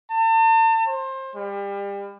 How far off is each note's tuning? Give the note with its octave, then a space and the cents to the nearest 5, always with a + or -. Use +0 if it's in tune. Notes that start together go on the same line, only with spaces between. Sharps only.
A5 +40
C5 +25
G3 +30